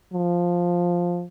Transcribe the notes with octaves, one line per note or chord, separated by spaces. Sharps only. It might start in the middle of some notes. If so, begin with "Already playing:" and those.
F3